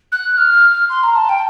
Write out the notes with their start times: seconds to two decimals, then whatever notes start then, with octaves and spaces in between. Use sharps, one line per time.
0.12 F#6
0.38 F6
0.90 C6
1.03 A#5
1.16 A5
1.29 G5